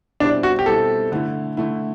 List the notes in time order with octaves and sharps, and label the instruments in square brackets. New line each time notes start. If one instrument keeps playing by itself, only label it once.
[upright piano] B2 G3 C4 E4 [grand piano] D4
[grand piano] F#4
G4
[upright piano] B2 G3 C4 E4 [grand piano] A4
[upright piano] D3 A3 E4
D3 A3 E4